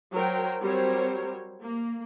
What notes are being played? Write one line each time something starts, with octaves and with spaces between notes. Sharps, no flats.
F#3 A#4 C5 G5
F#3 G3 C4 A#4 C5 C#5
A#3